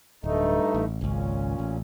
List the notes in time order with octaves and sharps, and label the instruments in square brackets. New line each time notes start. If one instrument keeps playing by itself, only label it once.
[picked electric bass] D1 [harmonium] G2 A3 D#4
[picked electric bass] A1
[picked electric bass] G#1 C#2 [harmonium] A#2 C#4
[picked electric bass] A1